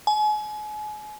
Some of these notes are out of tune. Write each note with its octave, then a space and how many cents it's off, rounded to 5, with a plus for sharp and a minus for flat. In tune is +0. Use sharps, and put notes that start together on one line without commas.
G#5 +35